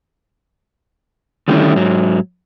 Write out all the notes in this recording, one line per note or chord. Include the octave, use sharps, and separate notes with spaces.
D3 D#3 G3 A3 C#4 E4
G#2 F#3